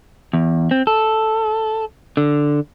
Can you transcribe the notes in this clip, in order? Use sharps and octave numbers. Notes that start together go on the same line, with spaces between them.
E2
C4
A4
D3